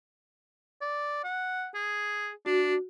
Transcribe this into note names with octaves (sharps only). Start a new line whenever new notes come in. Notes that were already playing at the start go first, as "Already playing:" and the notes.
D5
F#5
G#4
D4 F#4